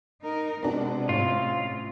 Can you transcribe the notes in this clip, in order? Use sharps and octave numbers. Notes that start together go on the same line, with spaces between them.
D#4 A#4
C3 G#3 B3 D4 F#4
A1 F4 C#5